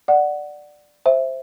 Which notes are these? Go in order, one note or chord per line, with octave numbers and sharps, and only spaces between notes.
D5 F#5
C5 E5